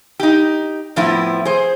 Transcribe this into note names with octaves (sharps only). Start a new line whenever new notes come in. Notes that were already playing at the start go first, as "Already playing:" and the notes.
D#4 G4
F2 A2 F3 B3 E4
G#4 C5